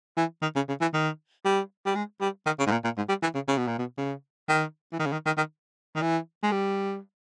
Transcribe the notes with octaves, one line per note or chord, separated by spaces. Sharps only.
E3
D#3
C#3
C#3
E3
D#3
G3
G3
G#3
G3
D#3
C#3
G#2
A#2
A#2
G#2
G3
E3
C#3
C#3
B2
A#2
B2
C#3
D#3
E3
D#3
C#3
D#3
D#3
D#3
D#3
E3
G#3
G3